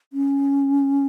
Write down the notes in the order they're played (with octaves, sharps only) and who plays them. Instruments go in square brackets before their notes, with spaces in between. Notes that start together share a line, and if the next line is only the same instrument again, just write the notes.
[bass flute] C#4